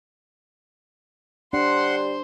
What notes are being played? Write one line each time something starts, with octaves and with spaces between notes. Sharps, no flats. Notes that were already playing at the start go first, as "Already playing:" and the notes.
G3 D4 C5 F#5 C6